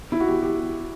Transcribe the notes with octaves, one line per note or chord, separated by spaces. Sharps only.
E4
F#4
G4
G4